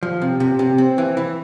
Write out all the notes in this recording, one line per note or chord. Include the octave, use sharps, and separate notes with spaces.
F3
C3
C3
C3
C4
E3
E3